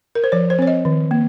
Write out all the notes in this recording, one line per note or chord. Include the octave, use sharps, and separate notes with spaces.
A#4
C5
F3 C#5
C5
C4 C#5
D#5
D#3
A#3